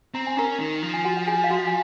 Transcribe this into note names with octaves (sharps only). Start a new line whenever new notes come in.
C4 A#5
G#5
C#4 A#4 A#5
D#3
F3
G#5
F#4 F#5
F#5
G#4 G#5
F5
F#4 F#5
G#5